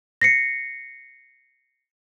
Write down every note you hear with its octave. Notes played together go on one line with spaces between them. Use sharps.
A#6 C7 C#7